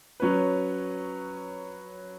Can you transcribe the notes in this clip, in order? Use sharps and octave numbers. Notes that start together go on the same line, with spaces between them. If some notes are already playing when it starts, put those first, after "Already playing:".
F#3 C#4 B4